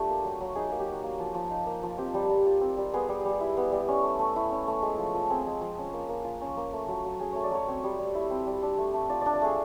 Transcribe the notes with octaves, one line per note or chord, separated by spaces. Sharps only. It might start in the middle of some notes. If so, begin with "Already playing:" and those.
Already playing: A3 D4 F4 G4
A#3
F#3
F#3
D#4 G#4
A#3 G#4
G4
F#3 F#4
A#3
F3
F3
D#4
A#3
F3
C4 G4
G3
G3
F4
C4
G3
B3 G#4
G3
G3
E4
B3
G3
C#4
A3
A3
E4
C#4
A3
G#3
F3
F3
C4 G#4
G#3
F3
C#4
A#3
A#3
F4
C#4
A#3
A3
F#3
F#3
C#4 G#4
A3 C#5
D5
F#3 C#5
C4 C#5
G3
G3
E4
C4
G3
D4
A3
A3
F4 D5
D4 D5
D5
A3 G#4